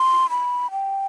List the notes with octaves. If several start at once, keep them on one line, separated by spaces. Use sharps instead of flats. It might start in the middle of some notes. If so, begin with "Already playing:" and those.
Already playing: C6
B5
G5